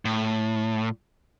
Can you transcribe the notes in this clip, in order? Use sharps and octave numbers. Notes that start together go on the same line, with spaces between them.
A2